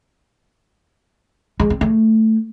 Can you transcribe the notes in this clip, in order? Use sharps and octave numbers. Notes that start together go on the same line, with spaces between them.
G#3
C4
A3